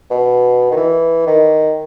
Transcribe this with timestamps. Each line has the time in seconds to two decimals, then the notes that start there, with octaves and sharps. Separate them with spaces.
0.10 B2
0.71 D#3
0.77 E3
1.26 D#3